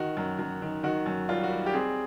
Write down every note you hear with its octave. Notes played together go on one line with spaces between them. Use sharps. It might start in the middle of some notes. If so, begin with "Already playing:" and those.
Already playing: D#3 F#4
F#2
F#2
D#3
D#3 F#4
F#2
G3 F4
F#4
G3
G4
C4 G#4